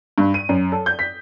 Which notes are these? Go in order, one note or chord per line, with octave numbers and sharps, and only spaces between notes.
G2
D#7
F#2
A4
G6
B6